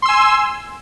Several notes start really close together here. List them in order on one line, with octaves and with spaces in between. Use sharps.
C6 E6 G#5